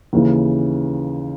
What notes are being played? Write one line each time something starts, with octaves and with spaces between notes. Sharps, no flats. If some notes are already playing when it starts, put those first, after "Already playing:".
D#2 C#3 E3